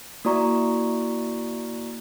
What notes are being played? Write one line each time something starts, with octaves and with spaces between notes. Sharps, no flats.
A#3 E4 F#4 D5 A#5 C#6